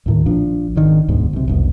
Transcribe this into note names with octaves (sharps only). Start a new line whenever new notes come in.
D#2 A2 D#3
A#1 F3 D4
G#1 D3 D#3
E1 D2 G#2 B2
B1 C3
F1 C2 B2